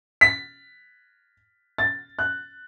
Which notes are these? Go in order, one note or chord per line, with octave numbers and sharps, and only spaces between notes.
B6
A6
F#6